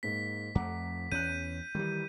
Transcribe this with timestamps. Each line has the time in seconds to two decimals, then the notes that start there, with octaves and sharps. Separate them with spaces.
0.03 G#2 A#3 B6
0.55 F2 A3 F#5 A#5 D6
1.12 E2 C#4 F#6 G6 D#7
1.75 D#3 E3 G3